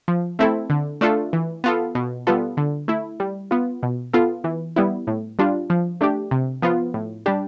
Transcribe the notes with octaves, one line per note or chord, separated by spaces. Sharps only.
F3
A3 C4 E4 A4
D3
A3 D4 F4 A4
E3
B3 F4 A4
B2
G3 B3 F4 A4
D3
A3 E4
G3
B3 F4
B2
B3 F4 A4
E3
G3 B3 E4
A2
G3 D4 F4
F3
A3 D4 G4
C3
F3 B3 F4
A2
G3 D4 G4